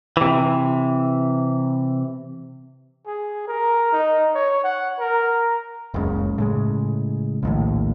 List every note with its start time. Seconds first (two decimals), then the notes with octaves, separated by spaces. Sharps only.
0.17 C3 E3
3.06 G#4
3.48 A#4
3.92 D#4
4.34 C#5
4.64 F#5
4.99 A#4
5.94 F#1 C#2 C#3
6.38 A2 C#3 G#3
7.43 A#1 D#2 A2